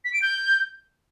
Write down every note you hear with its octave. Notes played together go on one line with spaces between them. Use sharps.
B6
D7
G6